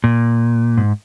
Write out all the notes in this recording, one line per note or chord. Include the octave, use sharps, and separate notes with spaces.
A#2
G#2